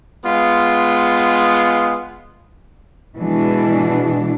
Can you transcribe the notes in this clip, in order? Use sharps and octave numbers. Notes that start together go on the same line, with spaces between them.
G#3 B3 F4
B2 E3 G#3 D4